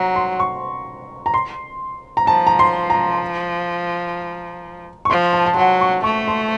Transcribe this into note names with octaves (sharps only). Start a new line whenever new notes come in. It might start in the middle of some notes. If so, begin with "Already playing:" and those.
Already playing: F#3 A#5
C6
C#6
A#5
C6
A#5
F3 A5
A#5
C6
A#5
C#6
F3 C6
A5
A5
F#3 F#5
C#6
A3 C#6
C6